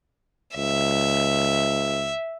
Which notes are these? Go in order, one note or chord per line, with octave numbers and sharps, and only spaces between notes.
C#2 E5